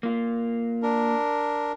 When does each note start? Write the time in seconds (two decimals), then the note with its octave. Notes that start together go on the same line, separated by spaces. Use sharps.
0.03 A#3 F4
0.83 D4 A#4